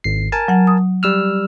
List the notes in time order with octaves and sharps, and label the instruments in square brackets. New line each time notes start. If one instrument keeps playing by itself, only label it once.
[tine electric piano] G#1 C7
A#4 G#5 A5
[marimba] F#3 F#5
D#6
[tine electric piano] G3 E6 F6